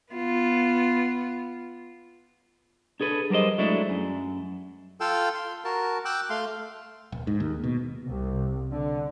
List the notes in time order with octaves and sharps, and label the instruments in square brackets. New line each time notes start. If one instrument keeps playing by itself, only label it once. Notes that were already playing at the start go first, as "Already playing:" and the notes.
[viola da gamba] B3 F4
[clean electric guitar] D4 G#4 A4 B4
F#3 G3 A#4 C5 D#5
F#3 G#3 A3 D4 E4
F#2
[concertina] F4 A4 F5 G5 E6
C6
F#4 A#4 A5
G5 D6 E6 F#6
A3 F5 C6
[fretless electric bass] D#1
G#2
D#2
B2
[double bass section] C2
D3